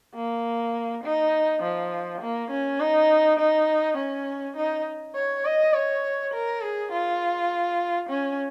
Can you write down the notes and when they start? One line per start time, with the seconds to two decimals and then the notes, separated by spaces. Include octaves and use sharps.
0.15 A#3
1.04 D#4
1.62 F3
2.21 A#3
2.51 C#4
2.80 D#4
3.39 D#4
3.98 C#4
4.56 D#4
5.15 C#5
5.45 D#5
5.73 C#5
6.33 A#4
6.62 G#4
6.92 F4
8.09 C#4